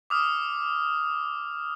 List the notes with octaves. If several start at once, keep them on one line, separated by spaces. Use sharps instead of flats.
D6 D#6 F6